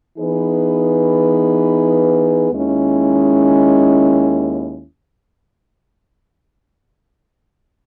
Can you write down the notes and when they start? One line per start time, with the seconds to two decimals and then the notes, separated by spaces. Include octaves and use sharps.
0.18 E3 B3 D#4 G#4 B4
2.51 D#2 D#3 G#3 C#4 E4